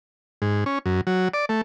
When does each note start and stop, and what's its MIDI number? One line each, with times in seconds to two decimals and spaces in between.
0.42 0.64 44
0.66 0.79 61
0.86 1.01 42
1.07 1.28 54
1.34 1.45 74
1.49 1.61 57